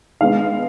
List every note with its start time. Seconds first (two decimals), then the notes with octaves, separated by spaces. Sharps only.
0.21 D#3 G#3 B3 D4 F5